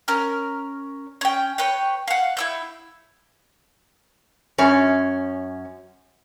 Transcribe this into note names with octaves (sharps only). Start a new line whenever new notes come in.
C#4 A#4 F6
C#4 G5
B4 C#5 G5
F5 F#5
E4 E6 G6
F#2 C#4